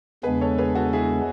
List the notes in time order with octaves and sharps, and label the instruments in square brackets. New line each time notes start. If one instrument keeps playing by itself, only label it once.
[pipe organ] E2 C#3 G#3 B3 D4 [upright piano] G#4 B4
[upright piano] A4 C#5
G#4 B4
F#4 A4
E4 G#4